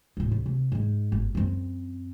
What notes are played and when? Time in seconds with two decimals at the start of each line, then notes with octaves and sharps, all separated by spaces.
0.17 D1 A2
0.31 C#3
0.46 C3
0.72 G#2 D#4
1.12 G1
1.35 F#2 C4